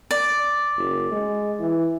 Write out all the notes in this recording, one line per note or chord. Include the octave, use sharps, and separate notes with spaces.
D5
F#1
G#3
E3